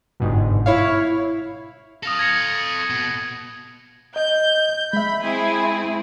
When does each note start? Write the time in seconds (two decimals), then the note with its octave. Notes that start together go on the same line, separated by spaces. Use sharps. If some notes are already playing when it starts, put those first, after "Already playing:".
0.20 G1 G#2 B2
0.66 E4 C#5 F5
2.03 A4 F5 D#6 A#6
2.19 G#6 A#6 C#7
2.90 B2
4.16 D#5 G6
4.93 G#3 E5 B5
5.23 C4 E4 G#4